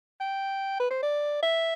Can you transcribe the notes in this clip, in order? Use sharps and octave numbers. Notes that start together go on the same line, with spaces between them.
G5
B4
C5
D5
E5